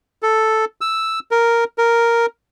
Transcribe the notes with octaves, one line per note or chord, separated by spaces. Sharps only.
A4
E6
A#4
A#4